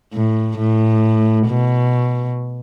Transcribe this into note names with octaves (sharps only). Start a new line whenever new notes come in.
A2
A2
B2